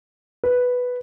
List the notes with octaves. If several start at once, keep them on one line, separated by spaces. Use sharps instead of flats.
B4